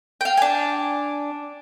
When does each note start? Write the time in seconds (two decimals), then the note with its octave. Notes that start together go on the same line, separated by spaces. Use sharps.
0.21 F5 G5
0.37 D4 G#5